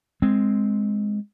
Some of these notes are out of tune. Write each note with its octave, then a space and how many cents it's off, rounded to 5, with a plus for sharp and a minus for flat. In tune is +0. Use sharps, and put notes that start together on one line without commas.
G#3 +0 C4 +0